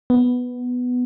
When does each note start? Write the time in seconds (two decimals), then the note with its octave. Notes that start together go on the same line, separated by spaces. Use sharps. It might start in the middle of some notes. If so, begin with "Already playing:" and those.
0.10 B3